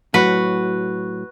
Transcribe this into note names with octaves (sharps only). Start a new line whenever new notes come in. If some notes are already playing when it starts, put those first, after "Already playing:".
A2 F#3 F#4 B4